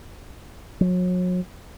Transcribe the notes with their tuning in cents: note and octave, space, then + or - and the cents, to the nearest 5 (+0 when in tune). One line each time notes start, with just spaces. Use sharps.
F#3 -35